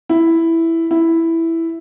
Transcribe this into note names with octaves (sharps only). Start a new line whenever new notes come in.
E4
E4